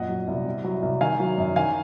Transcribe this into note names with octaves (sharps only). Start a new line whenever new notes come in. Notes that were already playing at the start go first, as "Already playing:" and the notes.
Already playing: F#2 A#2 D#5 F#5
F#3
C2
C3
F#3
C2
D#3 F5 G#5
F#3
F#2
D#3 F5 G#5